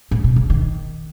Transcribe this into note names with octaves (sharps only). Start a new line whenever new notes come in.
A2
B2
C#3
D#3